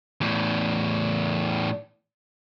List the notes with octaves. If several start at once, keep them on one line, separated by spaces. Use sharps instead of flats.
E2 A2